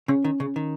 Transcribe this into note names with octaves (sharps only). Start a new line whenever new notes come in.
C#3 C#4
D#3
C#3
D#3